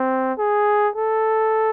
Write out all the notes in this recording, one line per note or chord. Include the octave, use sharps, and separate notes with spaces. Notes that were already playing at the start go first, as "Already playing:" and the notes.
Already playing: C4
G#4
A4